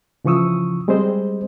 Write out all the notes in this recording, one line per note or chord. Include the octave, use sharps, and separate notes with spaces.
C#3 E3 F3 C#6 D#6 E6
G3 G#3 C4 G#4 C5 D#5